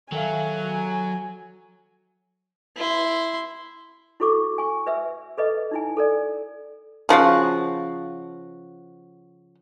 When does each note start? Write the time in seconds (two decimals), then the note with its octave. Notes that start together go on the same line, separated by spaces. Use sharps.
0.12 D#3 F#3 A4 E5 F5 G#5
2.77 E4 C6
4.20 E4 F#4 A4 C#6 D6
4.58 G#5 C#6
4.86 B4 E5 E6
5.37 A4 B4 D#5
5.71 D#4 E4 G#5
5.97 A4 A#4 D5
7.09 C#3 F3 F#4 F5